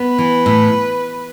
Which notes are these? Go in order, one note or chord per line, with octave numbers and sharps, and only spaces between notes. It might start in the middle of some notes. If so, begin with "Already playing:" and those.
Already playing: B3 B4
E3
A2